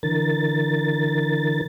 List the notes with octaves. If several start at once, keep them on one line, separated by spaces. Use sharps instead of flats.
D3 E3 A#4 A6